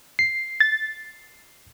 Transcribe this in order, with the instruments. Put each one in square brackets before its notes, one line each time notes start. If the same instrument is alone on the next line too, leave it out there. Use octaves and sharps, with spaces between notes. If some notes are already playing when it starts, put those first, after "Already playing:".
[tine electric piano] C7
[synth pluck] A6